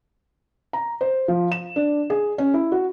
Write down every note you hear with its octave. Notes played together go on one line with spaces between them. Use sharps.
A#5
C5
F3
E7
D4
G#4
C#4
E4
F#4